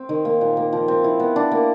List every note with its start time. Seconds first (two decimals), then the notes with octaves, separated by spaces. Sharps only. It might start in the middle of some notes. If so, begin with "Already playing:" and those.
Already playing: C4
0.09 D#3
0.25 A#3
0.41 A#2
0.57 A#3
0.73 F3
0.88 C4
1.04 E4
1.20 B3
1.36 D4
1.51 A#3